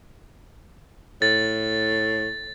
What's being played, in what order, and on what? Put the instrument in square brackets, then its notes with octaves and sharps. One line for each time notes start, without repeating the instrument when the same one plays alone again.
[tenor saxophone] A2 [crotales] A6